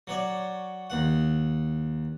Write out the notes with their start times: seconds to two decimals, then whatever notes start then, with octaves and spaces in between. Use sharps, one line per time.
0.07 F#3 C#5 D5
0.90 D#2 F#5